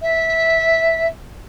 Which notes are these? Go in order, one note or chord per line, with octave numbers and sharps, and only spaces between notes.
E5